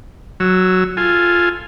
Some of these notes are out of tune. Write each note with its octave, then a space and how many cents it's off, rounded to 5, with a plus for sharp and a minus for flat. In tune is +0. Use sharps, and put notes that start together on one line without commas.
F#3 +0 E6 +0
F4 +0 A4 +0 G#5 +0